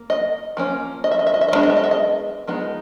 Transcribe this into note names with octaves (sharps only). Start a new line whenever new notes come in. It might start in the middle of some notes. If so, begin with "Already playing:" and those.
Already playing: A#3
D#5
F3 A#3 C#4
D#5
E5
D#5
E5
D#5
E5
D#5
D#3 G#3 B3 D4 E5
D#5
E5
D#5
E5
D#5
F3 G#3 B3 D#4